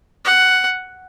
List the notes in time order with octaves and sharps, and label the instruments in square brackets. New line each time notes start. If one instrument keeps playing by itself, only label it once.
[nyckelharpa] F#5